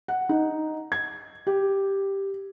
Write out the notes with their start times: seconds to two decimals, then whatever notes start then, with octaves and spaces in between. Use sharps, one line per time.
0.08 F#5
0.29 D#4
0.92 G#6
1.47 G4